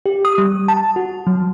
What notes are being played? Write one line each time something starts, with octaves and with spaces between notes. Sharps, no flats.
G4
D#6
G3
A5
F#4
F#3